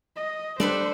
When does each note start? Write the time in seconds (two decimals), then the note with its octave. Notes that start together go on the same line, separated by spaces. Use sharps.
0.16 D#5
0.60 G3 D4 A4 B4 C5